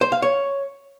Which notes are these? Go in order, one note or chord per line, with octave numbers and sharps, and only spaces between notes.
C5
F5
C#5